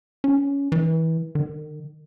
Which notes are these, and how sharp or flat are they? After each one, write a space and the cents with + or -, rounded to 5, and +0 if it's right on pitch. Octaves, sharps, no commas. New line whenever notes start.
C#4 +15
E3 -25
D#3 -40